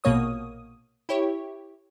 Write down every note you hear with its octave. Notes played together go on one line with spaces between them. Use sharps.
A#1 B2 A#3 C#5 D#6
E4 G4 C#5